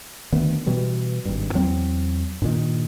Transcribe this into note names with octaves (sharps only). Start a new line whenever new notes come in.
D2 D#3 B3
B2 E3 G3
G#1 G2
E2 F#3 C4
G2 A#2 D#3